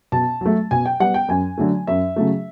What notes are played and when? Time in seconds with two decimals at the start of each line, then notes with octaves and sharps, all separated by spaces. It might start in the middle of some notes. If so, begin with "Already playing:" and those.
0.12 B2 A5
0.41 F#3 A3
0.71 B2 G#5
0.86 G5
1.00 G3 B3 F#5
1.14 G5
1.28 F#2 G#5
1.58 D3 F#3 A3
1.87 F#2 E5
2.16 C#3 F#3 A3